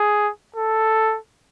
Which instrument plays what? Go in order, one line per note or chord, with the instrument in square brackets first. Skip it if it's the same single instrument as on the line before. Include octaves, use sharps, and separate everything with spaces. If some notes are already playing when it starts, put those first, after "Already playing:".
Already playing: [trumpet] G#4
A4